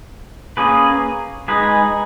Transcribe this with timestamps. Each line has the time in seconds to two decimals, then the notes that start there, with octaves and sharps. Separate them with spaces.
0.57 A#3 C#4 G#4 B4
1.48 G#3 D#4 G#4 B4